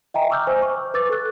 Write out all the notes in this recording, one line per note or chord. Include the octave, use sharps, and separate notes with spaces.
D#5 E5 G5 G#5 A#5
C#6 D6 E6 F6 G6
C5 G#5
C#6
B4 D6 E6 A6
A4 F#6